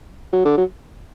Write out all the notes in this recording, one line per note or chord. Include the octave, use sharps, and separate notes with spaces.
F#3
D3
F#3